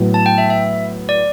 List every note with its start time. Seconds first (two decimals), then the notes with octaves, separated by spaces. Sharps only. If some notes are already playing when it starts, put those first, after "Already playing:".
Already playing: A2 F#3 B3
0.14 A5
0.26 G5
0.38 E5
0.50 E5
1.09 D5